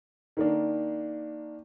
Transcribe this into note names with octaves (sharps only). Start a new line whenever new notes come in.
D#3 A#3 D4